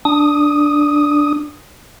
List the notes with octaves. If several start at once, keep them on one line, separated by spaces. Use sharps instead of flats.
D4 D#6